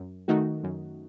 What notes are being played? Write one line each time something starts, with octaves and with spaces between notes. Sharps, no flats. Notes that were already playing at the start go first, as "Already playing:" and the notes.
Already playing: F#2
D#3 A3 D#4 F#4
F#2